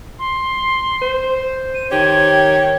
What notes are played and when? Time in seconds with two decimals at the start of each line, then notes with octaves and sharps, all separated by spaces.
0.19 C6
1.02 C5
1.75 D#7
1.91 D#3 G4 C#5 G#6